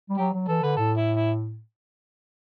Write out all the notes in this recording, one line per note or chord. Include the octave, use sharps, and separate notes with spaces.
G3
F#3 G4
F#3
E3 A4
D3 B4
A2 A4
E4
E4